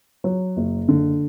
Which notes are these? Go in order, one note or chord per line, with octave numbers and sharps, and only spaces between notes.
F#3
F#1
D3